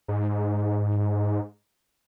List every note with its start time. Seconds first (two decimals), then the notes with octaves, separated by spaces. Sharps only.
0.08 G#2